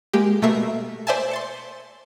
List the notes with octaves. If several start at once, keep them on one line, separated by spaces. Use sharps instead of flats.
G#3 A#3 G4
B2 A3 A#3 E5 E6 C7
C5 D5 E5 G#5 A5
C6 A6 C#7